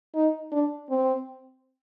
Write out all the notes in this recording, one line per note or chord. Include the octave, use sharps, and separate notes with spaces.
D#4
D4
C4